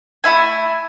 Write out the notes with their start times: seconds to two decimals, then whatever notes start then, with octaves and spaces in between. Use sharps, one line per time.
0.24 A3 E4 E5 G#5